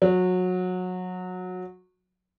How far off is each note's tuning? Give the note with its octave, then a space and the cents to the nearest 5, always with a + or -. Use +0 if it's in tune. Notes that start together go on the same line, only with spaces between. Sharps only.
F#3 -20